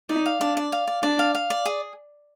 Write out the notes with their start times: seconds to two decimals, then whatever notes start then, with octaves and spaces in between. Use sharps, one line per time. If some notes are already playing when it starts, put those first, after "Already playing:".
0.09 D#4 D5
0.26 F5
0.41 D4 D5
0.57 D5
0.72 F5
0.87 D5
1.03 D4 D5
1.19 F5
1.35 F5
1.50 D5
1.65 G#4